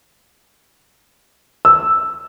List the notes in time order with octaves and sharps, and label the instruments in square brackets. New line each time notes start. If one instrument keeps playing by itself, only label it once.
[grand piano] E6